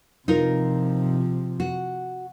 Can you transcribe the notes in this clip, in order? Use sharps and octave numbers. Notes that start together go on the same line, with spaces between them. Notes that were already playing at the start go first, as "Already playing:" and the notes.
C3 F3 D#4 F4 A#4
F#4